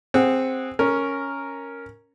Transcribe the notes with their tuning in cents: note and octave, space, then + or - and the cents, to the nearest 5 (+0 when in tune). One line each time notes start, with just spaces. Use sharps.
C4 +0 G#4 -15 F#5 -5
C#4 +0 A#4 +0